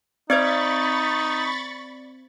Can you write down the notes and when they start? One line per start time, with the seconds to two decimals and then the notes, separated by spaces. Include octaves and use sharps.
0.30 C4 D#4 C5 D5 B5 C#6 G#6 A6